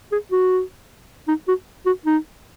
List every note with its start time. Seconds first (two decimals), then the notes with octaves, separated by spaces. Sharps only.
0.12 G#4
0.32 F#4
1.28 D#4
1.48 F#4
1.86 F#4
2.06 D#4